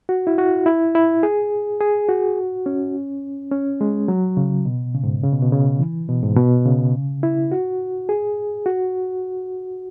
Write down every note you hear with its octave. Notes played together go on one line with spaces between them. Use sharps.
F#4
E4
F#4
E4
E4
G#4
G#4
F#4
C#4
C#4
G#3
F#3
C#3
B2
C#3
G#2
C#3
B2
B2
C#3
E3
B2
G#2
B2
C#3
E4
F#4
G#4
F#4